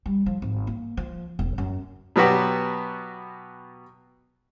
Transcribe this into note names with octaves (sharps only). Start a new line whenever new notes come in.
G3
F3
G#1
A#3
F3
E1
F#2
B2 F#3 B3 F#4 G4